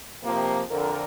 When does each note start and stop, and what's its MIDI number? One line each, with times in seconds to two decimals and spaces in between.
0.24 0.60 48
0.24 0.60 53
0.24 0.60 58
0.69 1.04 41
0.69 1.04 50
0.69 1.04 70